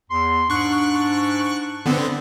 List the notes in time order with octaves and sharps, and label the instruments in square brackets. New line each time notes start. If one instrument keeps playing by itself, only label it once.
[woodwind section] E2 C6
[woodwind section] G#2 D4 [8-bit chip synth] C#6 F#6
[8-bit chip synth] D3 B3 C4